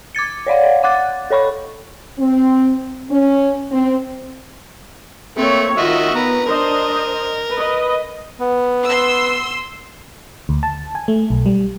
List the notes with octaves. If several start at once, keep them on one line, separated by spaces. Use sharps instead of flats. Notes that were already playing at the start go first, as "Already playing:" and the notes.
D6 G#6 A6 C#7
C#5 D5 F5 F#5
F#5 D6 F#6 A6
A4 C#5 B5 C#6
C4
C#4
C4
A3 A#3 C4 C#5
D#3 F4 F#4 D#5 E5
B3 B4 A#5
D4 A#4 C5 D#5
B4 D#5
B3
C6 E6
D2
A5
G#5
A3
B1
G3